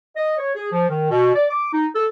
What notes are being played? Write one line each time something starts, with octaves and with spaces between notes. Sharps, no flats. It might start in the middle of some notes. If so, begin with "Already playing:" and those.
D#5
C#5
G#4
F3
D#3
B2
D5
D6
D#4
A4